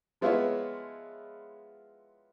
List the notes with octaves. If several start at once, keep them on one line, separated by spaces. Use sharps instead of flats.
F3 G#3 B3 E4 F4 C#5